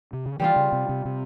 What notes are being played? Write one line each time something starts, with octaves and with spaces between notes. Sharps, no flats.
C3
C#3
E3 G3 C4 F4
C#3
C3
C3
C3